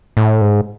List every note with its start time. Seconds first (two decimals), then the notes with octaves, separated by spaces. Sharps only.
0.17 A2
0.41 G#2